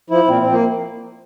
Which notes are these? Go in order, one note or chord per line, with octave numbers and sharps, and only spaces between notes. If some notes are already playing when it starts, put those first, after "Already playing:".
F3 E4
A#2 C4
C4
F3
A#3